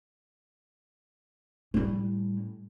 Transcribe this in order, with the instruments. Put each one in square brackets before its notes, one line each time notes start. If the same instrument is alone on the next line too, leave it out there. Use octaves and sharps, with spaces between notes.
[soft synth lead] A2 [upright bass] G3 C#4